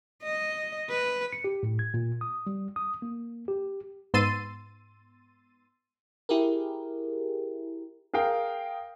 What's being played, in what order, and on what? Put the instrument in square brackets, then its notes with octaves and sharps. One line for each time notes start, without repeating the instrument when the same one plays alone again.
[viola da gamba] D#5
B4
[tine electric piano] C#7
G4
A2
G#6
A#2
D#6
G3
D#6
A#3
G4
[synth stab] G#2 B3 C6 E6 A6 D#7
[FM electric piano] E4 G4 G#4 A#4
[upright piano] G#4 A#4 F5 G5